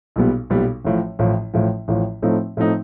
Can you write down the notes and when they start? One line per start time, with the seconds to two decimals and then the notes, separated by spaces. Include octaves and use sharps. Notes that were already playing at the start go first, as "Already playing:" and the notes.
0.16 B1 A#2 G3 B3
0.50 B1 A#2 G3 B3
0.85 A1 A2 F3
1.19 A1 A2 F3
1.54 A1 A2 F3
1.88 A1 A2 F3
2.22 A2 F3 A3 C4 D#4
2.57 A2 F3 A3 C4 D#4